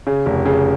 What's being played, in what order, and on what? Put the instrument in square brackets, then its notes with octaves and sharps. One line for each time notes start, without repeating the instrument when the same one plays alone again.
[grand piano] C#3
F1
C#3